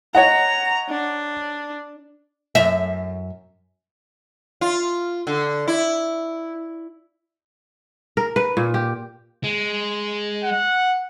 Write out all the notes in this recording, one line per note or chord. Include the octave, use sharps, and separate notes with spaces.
C#5 D#5 F#5 A#5
D4
F#2 E5
F4
D3
E4
A#4
B4
A#2
G4
G#3
F#5